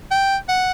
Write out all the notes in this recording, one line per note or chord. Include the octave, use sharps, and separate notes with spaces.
G5
F#5